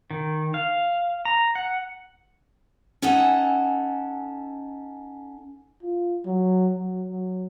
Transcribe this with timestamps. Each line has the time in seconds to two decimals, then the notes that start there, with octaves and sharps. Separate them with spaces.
0.11 D#3
0.54 F5
1.25 A#5
1.55 F#5
3.02 C#4 D#4 A4 E5 F#5 G#5
5.83 F4
6.26 F#3
6.76 F#3
7.09 F#3